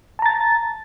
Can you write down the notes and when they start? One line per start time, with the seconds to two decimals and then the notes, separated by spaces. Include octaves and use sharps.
0.19 A5
0.22 A#5
0.26 A6